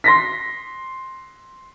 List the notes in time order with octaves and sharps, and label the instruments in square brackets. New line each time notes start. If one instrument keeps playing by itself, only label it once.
[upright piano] C6 A#6 B6